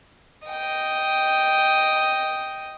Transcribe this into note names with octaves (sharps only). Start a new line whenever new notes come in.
D#5 G5